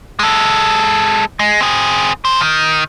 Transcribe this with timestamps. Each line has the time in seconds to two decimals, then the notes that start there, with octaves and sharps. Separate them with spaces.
0.19 G#3 A4
1.39 G#3
1.61 C4 G#4
2.25 F#2 C5
2.41 D#3